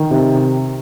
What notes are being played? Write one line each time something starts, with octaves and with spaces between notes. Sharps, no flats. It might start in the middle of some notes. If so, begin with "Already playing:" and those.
Already playing: D#3
C3